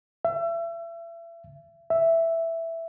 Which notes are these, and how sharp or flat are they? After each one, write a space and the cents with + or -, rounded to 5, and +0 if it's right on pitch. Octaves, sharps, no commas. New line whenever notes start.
E5 +35
E5 +5